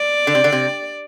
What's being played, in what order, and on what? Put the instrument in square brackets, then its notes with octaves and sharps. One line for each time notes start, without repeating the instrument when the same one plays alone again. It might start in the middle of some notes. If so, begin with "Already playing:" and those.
Already playing: [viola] D5
[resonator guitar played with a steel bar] D3
C3
D3
C3